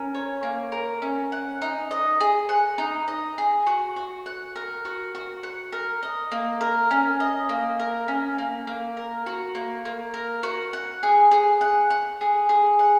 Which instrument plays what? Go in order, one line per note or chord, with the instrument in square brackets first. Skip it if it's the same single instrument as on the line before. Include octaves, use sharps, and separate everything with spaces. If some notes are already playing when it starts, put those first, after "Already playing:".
Already playing: [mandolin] C#4 A#4
C#5
A#3
A#4
C#4
F#5
D#4
D#5
G#4
F#5
D#4
D#5
G#4
F#4
F#4
F#5
A#4
F#4
F#4
F#5
A#4
D#5
A#3
A#4
C#4
D#5
A#3
A#4
C#4
A#3
A#3
A#4
F#4
A#3
A#3
A#4
F#4
F#5
G#4
G#4
F#5
F#5
G#4
G#4
F#5